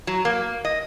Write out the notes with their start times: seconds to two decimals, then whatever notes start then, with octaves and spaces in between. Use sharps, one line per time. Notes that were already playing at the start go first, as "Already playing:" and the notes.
0.07 F#3
0.25 A#3
0.65 D#5